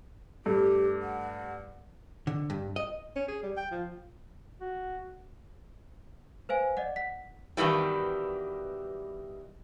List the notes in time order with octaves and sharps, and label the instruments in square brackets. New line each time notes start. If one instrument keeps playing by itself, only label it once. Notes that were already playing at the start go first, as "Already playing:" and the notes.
[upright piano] G2 A3 [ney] G4
[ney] F#5
[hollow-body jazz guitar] D3
G2
D#5
[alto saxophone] C#4
G#4
G3
G5
F3
[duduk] F#4
[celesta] B4 C5 F5 G#5
D5 D#5 F#5
F#5 B6
[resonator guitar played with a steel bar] G2 B2 D#3 E3 G3